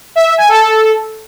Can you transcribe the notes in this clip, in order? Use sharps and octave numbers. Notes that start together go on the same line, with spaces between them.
E5
E5
G#5
A4